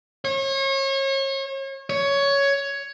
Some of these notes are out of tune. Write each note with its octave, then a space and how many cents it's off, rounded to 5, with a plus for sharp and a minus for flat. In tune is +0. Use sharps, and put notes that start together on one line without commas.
C#5 -35
C#5 +10